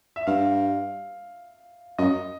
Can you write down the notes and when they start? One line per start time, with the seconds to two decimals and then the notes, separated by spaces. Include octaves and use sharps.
0.16 E5
0.27 G2 F5
1.98 F#2 D#5